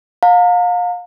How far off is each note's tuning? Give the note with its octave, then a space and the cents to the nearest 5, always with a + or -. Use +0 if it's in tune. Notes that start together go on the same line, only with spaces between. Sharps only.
F5 +30 A#5 -35